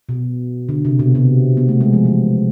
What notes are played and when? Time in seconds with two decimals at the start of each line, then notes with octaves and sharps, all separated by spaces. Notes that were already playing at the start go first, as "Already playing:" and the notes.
0.09 B2
0.69 D3
0.85 C3
0.99 B2
1.15 C3
1.57 B3
1.69 A3
1.81 G#3
1.93 F3
2.05 E3